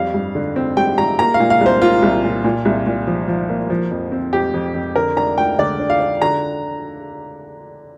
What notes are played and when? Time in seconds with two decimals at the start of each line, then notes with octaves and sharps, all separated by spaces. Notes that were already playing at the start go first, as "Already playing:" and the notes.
Already playing: F2 G3 F5
0.14 G2
0.35 D3
0.56 C4
0.77 G3 G5
0.98 G3 A#5
1.19 A#3 A#5
1.34 F5
1.40 A#2
1.50 F5
1.61 C2
1.66 C5
1.81 A#3 F4
2.02 C2
2.24 A#2
2.45 A#2
2.65 C2
2.86 A#2
3.07 F3
3.28 F3
3.49 A#3
3.70 F3
3.91 F2
4.12 C4
4.33 F2 G4
4.54 F2
4.75 F2
4.96 D3 A#4
5.17 D4 A#5
5.38 D2 G5
5.58 D3 D5
5.79 D4
5.90 F5
6.00 D4
6.22 D3 A#5